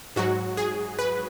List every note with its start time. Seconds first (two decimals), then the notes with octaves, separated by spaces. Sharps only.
0.16 G#2 F#3 F#4
0.57 G#4
0.99 B4